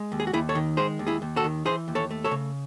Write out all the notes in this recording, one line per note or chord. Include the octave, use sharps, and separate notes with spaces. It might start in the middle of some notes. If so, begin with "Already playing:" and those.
Already playing: G#3
D#2
G#4
F#4
D#2 E4 G#4
A4 C#5
D#3
G#3 G#4 C5
D#2
E4 G#4
D#2
F#4 A4
D#3
E3 G#4 C5
D#2
A4 C#5
A3
A4 C#5
C#3